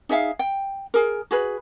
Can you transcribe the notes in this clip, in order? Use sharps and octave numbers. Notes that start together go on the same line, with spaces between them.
D#4 G#4 E5 F5
G5
G#4 A#4
F#4 G#4 B4